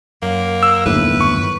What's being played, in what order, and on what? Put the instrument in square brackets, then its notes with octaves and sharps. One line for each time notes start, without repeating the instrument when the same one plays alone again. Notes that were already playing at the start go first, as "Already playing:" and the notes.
[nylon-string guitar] F#2 [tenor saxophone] A#3
[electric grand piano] E6
[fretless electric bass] G1 D#2 A2 [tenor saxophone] B4
[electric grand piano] C#6